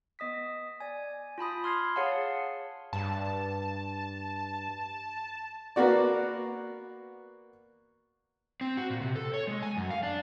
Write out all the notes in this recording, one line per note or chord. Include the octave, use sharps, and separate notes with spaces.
B3 D#5 D#6 B6
D5 G#5
F4 A5 B5 D#6
C6 F6 G#6 C7
G#4 C#5 F5 F#5 A5
G2 A5
A#3 B3 F#4 D5
C4
F#4
A#2
C3
A4
C#5
G#3
G#5
F#2
F5
D4